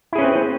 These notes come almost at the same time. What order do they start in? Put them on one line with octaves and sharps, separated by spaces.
E4 G#4 C#4 B4 C4